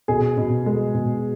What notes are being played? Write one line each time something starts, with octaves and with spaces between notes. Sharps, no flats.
B2 G#4
B2
G#3
B2